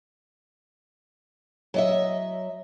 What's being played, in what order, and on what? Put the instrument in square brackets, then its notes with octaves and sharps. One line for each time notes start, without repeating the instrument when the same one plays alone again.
[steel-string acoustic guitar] F#3 D#5 E5